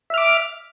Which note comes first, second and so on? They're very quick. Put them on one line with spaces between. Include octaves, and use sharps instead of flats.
E5 F6 D6